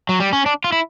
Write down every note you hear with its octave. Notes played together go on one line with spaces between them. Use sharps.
F#3
G3
C#4
D4
F4
E4